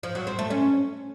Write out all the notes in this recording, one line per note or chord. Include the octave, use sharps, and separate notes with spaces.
F3
F#3
C4
A3
C#4